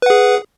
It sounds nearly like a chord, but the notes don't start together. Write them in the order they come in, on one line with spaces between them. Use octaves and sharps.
B4 F#5 G#4